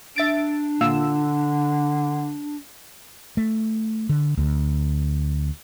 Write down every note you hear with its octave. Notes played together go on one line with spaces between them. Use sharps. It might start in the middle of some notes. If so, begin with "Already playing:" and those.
D4 E5 A6 D7
A#2 D3 F4 E6
A3
D3
D2